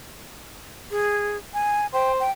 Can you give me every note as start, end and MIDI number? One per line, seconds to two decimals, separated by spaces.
0.91 1.37 68
1.54 1.87 80
1.93 2.23 72
1.93 2.12 79
2.20 2.31 79